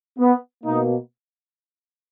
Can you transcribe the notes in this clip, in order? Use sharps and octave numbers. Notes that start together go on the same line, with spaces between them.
B3
B2 A#3 D#4